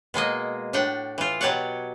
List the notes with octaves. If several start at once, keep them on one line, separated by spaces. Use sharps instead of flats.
B2 G#3 A#3 D#5
A2 D4 F#5 G5
E3 F4
B2 F#3 G4 C#5 D5 F#5